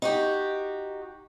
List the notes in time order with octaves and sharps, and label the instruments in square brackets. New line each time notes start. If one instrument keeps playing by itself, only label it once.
[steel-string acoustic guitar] D#4 F#4 G4